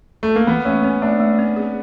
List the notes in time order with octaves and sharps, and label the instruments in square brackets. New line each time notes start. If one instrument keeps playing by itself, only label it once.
[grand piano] A3
A#3
[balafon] E3 [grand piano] B3
[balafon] A3 [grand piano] C#4
[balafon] C4 [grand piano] C#4
[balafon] A3 [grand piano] D4
[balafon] A3
C4
G#4